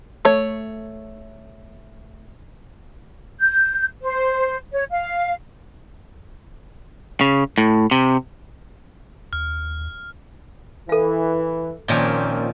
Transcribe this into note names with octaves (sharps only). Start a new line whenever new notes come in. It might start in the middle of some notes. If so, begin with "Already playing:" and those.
A3 C#5
G6
C5
C#5
F5
C#3
A2
C3
D#2 F6
E3 A4 F5
A#2 D#3 F3 A#3 C4 C#4